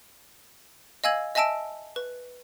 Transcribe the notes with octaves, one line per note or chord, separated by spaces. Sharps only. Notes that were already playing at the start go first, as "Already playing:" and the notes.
D#5 F5 G#5 E6 G#6 F#7
D#5 E5 G#5 A5 E6 D7
B4